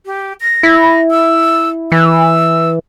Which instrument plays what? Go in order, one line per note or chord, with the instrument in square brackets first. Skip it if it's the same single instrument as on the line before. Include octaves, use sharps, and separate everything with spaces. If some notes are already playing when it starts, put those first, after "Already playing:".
[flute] G4
A#6
[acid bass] E4
[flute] E6
[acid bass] E3 [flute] E6